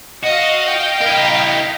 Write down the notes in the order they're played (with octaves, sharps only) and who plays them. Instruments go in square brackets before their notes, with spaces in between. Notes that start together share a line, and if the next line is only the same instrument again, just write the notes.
[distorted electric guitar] F#4 [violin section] D#5 F5
[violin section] D#5 F5 G5
[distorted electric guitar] E4 A#4